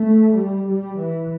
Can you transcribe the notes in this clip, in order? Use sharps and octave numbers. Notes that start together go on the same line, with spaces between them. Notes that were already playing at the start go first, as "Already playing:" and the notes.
Already playing: A3
G3
G3
E3